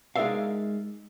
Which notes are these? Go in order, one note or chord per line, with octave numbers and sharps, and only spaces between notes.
G#3 D#4 A#4 D5 E5 F5